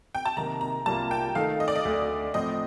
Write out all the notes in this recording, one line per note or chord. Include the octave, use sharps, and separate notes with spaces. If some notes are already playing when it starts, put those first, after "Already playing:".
G5
A5
C3 D#3 A#3 A#5
A#5
C2 C3 G3 A#3 F4 A5
G5
D#3 A3 D#4 A4 F5
D#5
D5
D#5
D2 D3 A3
A2 F3 C4 D#5